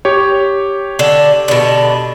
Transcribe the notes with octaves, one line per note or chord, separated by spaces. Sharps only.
G4 C#5
D3
B2 D3